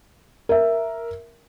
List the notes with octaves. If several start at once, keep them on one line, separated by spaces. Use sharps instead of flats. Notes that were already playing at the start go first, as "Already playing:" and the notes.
A#4 E5